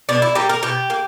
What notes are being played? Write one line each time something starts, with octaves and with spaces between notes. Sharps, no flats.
B2 D4
E4
G3 A#3 G4
A#4
B2 G4
A#3